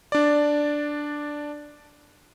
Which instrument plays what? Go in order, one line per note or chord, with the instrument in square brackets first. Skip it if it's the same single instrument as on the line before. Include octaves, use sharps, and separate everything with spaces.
[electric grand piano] D4 D5